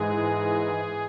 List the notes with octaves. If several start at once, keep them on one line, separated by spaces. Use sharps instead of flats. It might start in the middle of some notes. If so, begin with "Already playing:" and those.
Already playing: G#2 E3 G#3 G#4